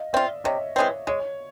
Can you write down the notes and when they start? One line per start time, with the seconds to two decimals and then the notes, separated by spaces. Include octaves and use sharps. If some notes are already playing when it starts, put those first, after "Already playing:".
Already playing: D#5 F5
0.13 C4 F4 D5 E5
0.44 C3 C#5 D#5
0.76 E3 G#3 C4 C#5
1.07 G#3 C#5